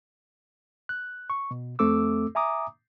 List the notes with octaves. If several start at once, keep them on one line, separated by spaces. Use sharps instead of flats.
F#6
C#6
B2
F2 A3 C4 A4 D6 E6
E5 G#5 A#5 D6 D#6